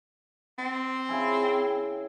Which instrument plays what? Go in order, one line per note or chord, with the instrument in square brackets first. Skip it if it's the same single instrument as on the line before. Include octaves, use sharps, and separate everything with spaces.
[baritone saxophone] C4
[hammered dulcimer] C#3 E4 G#5